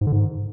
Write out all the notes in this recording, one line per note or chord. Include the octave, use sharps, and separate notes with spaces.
G#2
D3
G#2